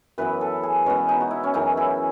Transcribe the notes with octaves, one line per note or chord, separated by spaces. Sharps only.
F#2 E3 B3 B4
A4
G#4
B2 G#3 B3 C#4
D#4
F#4
E4
C#4
F#2 C#3 E3 D#4
E4